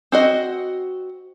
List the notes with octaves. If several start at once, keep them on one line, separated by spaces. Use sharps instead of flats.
C4 F#4 D#5